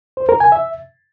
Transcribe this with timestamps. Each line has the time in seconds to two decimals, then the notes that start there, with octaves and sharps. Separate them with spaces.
0.17 C5
0.29 A#4
0.40 G#5
0.52 E5